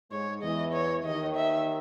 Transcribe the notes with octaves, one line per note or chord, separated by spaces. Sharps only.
G#2 G#3 C#5
E2 E3 D#5
C#5
D#2 D#3 D#5
E5